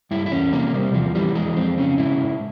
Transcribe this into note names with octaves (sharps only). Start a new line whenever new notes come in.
G2 E4
E4
E2 C#4
C3 A#3
C3 G3
E2 F3
E3 G3
F2 G#3
F2 C4
C#3 C#4
G#2 E4
G#2